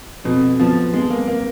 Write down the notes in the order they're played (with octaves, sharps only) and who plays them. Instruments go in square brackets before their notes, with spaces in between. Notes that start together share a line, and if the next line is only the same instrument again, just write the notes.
[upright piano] F2 [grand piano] B2
[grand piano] F3 [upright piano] B3
[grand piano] G#3 [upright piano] B3
[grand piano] A#3
A#3